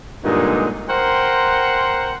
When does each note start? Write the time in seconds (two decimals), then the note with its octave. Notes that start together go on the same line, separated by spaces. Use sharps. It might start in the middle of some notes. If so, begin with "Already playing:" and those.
0.24 G2 A#2 D3 F#3 G#3 D#4
0.90 A#4 C5 F#5 G5 A#5 C6